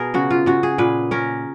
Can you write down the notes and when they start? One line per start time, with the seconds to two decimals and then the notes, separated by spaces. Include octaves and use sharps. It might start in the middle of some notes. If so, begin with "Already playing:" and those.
Already playing: B2 G#4 A#4
0.14 C#3 F#4
0.30 F4
0.46 C#3 F#4
0.63 G#4
0.78 A#2 B4
1.11 C#4 A#4